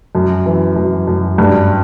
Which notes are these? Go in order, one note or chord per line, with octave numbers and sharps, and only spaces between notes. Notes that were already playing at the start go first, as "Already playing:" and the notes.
F#2
E3
F#2
F#2
G2